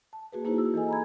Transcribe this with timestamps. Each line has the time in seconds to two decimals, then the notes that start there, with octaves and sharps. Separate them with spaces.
0.13 A5
0.32 A#3 F#4 G#4 B4
0.45 A#3 D#4 E4 F#4 G#4 C5
0.58 E6
0.74 E3 A4 D#5 G#5
0.89 A#5 B5 G#6